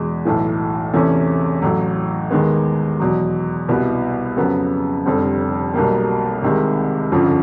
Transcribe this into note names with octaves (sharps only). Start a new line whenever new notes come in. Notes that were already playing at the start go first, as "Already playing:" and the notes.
Already playing: E2 B2 G#3
B1 A2 E3
E2 C3 E3 A3 C#4
A1 A2 F#3
D#2 D#3 G#3 B3
E2 B2 F#3
C2 B2 G3 B3 E4
F2 C#3 F#3 B3
F1 F2 D3 G3 C4
B1 B2 G3 A#3
C2 C3 D#3 G#3
G1 F2 C#3 F3